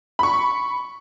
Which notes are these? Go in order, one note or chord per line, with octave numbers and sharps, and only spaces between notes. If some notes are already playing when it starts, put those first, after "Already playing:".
B5 C#6